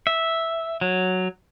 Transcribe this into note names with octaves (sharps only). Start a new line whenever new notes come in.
E5
F#3